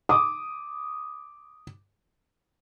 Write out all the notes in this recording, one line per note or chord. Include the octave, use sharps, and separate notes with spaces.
D6 D#6